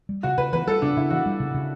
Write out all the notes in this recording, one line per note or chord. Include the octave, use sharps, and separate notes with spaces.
G3
C#3 F#4
C#3 B4
E3 B4
G3 A4
C#3 D4
C#3 E4
E3 F#4
G3
C#3
C#3